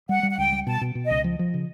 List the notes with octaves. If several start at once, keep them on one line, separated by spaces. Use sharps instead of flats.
G3 F#5
G3
F#5
C#2 G5
G3
B2 A5
B2
B2
C#2 D#5
F3
F3
C#3